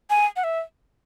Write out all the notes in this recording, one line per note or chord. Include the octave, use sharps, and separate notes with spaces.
G#5
F#5
E5